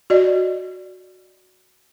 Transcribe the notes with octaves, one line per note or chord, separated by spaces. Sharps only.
F#4 D5 D#5